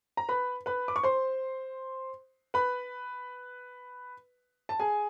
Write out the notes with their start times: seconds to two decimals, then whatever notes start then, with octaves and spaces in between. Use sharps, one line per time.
0.17 A#5
0.29 B4 B5
0.66 B4 B5
0.88 D6
0.96 C#6
1.03 C5 C6
2.54 B4 B5
4.69 A5
4.80 G#4 G#5